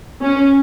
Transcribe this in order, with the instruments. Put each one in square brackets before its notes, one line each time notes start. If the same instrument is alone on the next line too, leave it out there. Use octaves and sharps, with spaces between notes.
[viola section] C#4